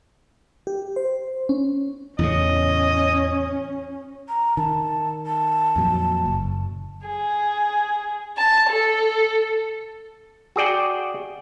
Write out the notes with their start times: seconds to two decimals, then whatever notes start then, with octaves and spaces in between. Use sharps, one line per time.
0.67 G4
0.96 C5
1.49 C#4
2.19 E2 A2 C#3 C#4 D#5
4.29 A#5
4.57 D#3 A5
5.26 A5
5.76 F2 A#2 F#3
6.26 F#1
7.06 G#4
8.37 A5
8.69 A4
10.56 F#4 G#4 D5 G5